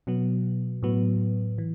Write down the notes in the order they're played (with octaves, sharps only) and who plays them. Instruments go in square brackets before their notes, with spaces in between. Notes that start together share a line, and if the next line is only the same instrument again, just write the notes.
[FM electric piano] B2 F#3 B3
A2 F#3 B3
E3